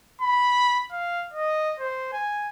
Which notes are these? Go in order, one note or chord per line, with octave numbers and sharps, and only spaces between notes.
B5
F5
D#5
C5
G#5